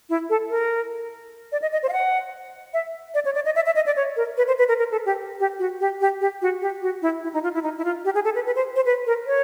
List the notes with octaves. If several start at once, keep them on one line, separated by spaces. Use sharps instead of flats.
E4
A4
A#4
D5
D#5
D#5
C5
F5
F#5
E5
D5
C#5
D5
D#5
E5
E5
D#5
D5
C#5
A#4
B4
C5
B4
A#4
A#4
A4
G4
G4
F#4
G4
G4
G4
F#4
G4
F#4
E4
E4
D#4
F4
E4
D#4
E4
F4
G4
G#4
A4
B4
B4
C5
C5
B4
A#4
C#5